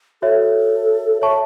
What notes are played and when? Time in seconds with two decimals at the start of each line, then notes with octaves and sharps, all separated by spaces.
0.22 F#4 A4 C#5 E5
1.21 C#5 E5 A5 C#6